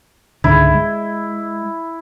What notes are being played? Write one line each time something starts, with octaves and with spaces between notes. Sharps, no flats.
C#2 G#2 D3 E4
G#3